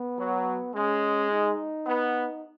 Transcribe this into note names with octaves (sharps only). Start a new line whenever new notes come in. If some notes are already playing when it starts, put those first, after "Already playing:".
Already playing: B3
F#3
G#3 C#4
D#4
B3